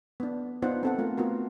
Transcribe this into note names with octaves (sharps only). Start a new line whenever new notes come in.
B3 D4
B3 D4 D#4 F4 C5 F#5
C4 A4 F#5
A3 F4 A#4
B3 F4 F#4 A#4